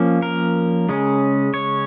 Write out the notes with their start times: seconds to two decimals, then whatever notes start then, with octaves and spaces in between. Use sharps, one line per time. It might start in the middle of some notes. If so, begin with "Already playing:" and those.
Already playing: F3 A#3 C#4
0.22 A#4
0.89 C#3 G#3 C#4
1.54 C#5